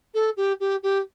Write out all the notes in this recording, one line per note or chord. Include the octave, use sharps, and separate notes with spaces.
A4
G4
G4
G4